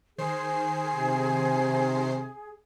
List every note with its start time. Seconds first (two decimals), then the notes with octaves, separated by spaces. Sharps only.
0.18 D#3 G#4 C5 C7
0.96 C3